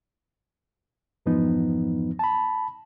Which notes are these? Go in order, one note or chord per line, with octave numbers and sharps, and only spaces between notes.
F2 G#2 E3 F3 B3 D#4
A5 B5